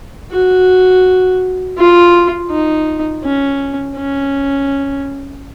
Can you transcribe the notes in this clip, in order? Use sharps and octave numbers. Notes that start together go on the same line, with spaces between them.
F#4
F4
D#4
C#4
C#4